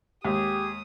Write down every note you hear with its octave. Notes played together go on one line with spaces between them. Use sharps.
D#2 G#3 G4 G#4 D#6